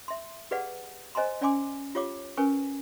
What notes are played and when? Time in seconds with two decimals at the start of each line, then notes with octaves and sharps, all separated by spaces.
0.08 E5 C6
0.51 G4 G#4 B4 D5 F5 F#5
1.15 C5 D#5 G#5 A#5 C6
1.41 C#4 D5 G5 G#5 C6 D6
1.95 F4 G4 C#5 F5 D6
2.37 C#4 A#4 B4 G5 G#5 C#6